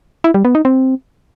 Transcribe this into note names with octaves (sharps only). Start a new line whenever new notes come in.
E4
G3
B3
D#4
C4